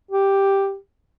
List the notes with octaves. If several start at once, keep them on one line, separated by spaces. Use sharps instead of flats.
G4